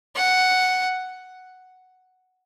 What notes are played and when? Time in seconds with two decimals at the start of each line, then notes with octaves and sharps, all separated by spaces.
0.16 F#5